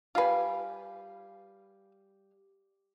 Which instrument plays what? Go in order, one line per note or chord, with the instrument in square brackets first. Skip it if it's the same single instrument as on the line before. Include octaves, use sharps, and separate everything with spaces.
[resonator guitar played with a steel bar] G3 F5 G#5 [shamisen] F4 B4